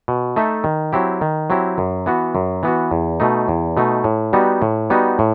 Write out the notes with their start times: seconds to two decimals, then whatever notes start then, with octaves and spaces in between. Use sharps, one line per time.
0.08 B2
0.36 A3 D#4 A4 E5
0.64 D#3
0.93 F#3 C4 E4 G4
1.21 D#3
1.50 F#3 C4 E4 G4
1.78 F#2
2.06 E3 B3 F#4
2.35 F#2
2.63 E3 B3 F#4
2.91 E2
3.20 B2 A3 D#4
3.48 E2
3.77 B2 A3 D#4
4.04 A2
4.33 G3 B3 D#4 F#4
4.62 A2
4.90 G3 B3 D#4 F#4
5.19 A2